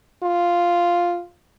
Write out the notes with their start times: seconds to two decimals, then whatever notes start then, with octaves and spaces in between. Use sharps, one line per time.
0.23 F4